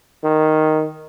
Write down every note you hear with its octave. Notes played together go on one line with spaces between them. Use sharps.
D#3